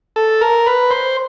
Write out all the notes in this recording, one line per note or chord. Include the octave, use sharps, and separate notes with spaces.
A4
A#4
B4
C5